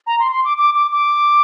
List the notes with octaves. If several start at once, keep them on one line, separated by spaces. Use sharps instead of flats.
A#5
C6
C6
D6
D6
D6
D6